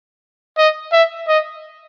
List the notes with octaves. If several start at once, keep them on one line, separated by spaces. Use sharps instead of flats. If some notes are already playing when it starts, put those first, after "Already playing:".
D#5
E5
D#5